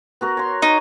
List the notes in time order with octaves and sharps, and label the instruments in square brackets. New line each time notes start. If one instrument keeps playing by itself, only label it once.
[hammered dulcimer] B3 F#4 A#4
C#5 C6
[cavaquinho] D#4